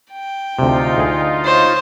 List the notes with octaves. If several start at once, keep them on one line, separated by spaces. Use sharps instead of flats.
G5
D2 C3 D#4 F4
D2 G#4
C5 C#5